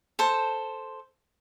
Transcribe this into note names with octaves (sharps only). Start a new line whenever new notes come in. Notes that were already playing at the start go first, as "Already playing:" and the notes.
A4 C5